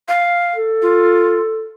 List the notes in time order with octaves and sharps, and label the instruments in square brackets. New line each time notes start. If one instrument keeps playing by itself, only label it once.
[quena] F5
[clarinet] A4
[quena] F4